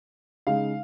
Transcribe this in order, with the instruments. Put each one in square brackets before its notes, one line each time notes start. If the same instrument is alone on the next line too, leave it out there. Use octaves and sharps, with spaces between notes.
[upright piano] C#3 G#3 D#4 F5